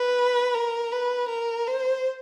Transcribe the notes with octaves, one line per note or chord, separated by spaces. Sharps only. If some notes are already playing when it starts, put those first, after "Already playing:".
Already playing: B4
A#4
B4
A#4
C5